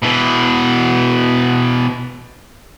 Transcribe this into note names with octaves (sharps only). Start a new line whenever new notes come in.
B2 E3